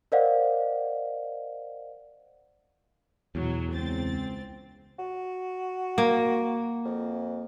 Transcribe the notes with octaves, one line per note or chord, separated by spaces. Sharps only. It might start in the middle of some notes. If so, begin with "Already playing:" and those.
A#4 C5 D5 D#5 F5 F#5
E2 B2 F#3
C#2 C4 A6
F#4
A#3
F2